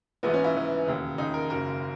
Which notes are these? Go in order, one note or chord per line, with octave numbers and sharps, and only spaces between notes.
A#1 G#2 E3 B3
C#4
E4
A#1 G#2 E3
E1 D#2 C#3
E1 D#2 C#3 D#4
A#4
F#1 F#2 C#3 A#4